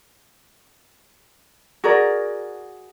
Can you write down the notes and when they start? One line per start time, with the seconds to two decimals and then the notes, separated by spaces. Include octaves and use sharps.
1.84 F#4 G#4 A#4 D5